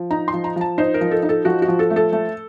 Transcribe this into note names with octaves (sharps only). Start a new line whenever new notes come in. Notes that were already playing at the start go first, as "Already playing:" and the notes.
Already playing: F3
D#4 A#5
C6
F3
A#5
F3 A5
D#4 C5
A#4
F3
A4
D#4
A4
F3 F#4
F#4
F3
A4
A3
A4
A3